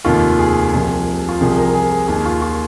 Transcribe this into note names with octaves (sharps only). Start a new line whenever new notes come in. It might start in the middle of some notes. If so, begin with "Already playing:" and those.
F1 D#2 D#3 F4
G#4
C2 C3 F3
F4
C2 C3 F3 G#4
A#4
G#4
G#4
D#2 D#3 G#4
F4
F4